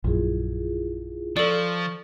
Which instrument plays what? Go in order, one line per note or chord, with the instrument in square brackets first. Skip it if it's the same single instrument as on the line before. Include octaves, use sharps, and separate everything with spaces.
[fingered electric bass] A#1 F#2 [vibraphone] E4 F4 G#4
[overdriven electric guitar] F3 [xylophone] A4 D5 [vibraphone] C#6